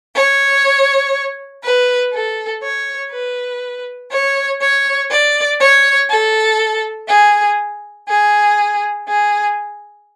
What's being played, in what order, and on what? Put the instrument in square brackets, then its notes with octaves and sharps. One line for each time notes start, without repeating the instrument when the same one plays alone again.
[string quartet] C#5
B4
A4
C#5
B4
C#5
C#5
D5
C#5
A4
G#4
G#4
G#4